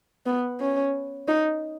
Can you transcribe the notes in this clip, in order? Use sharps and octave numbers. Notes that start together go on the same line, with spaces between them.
B3
C#4
D#4